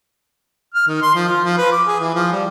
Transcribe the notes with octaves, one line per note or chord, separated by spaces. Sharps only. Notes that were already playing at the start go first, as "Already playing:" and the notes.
F6
D#3
C6
F3
F4
F3
B4
D6
G#4
E3
F3
G3